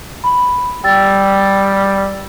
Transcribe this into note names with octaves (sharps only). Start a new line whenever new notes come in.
B5
G3 G5 E6 A6